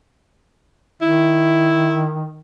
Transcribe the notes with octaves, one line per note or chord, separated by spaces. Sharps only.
D#3 E4